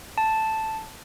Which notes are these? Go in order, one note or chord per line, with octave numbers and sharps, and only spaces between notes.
A5